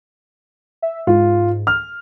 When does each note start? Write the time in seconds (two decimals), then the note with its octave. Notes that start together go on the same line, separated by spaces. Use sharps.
0.82 E5
1.07 G#2 F4
1.67 F6